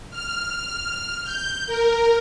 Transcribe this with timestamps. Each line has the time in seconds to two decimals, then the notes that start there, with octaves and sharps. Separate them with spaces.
0.10 F6
1.24 G6
1.67 A#4